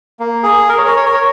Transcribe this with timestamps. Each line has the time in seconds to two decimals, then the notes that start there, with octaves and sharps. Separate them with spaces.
0.19 A#3
0.43 G#4
0.69 A#4
0.78 C#5
0.87 A#4
0.96 C#5
1.05 A#4
1.14 C#5